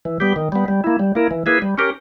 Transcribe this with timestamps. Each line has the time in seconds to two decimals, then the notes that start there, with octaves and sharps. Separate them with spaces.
0.05 E3
0.20 G3 B3 G4
0.36 D#3
0.52 G3 B3
0.68 G3
0.84 A#3 E4
0.99 G3
1.15 A#3 E4 A#4
1.31 E3
1.46 A#3 E4 G#4 B4
1.62 G3
1.78 C#4 G4 A#4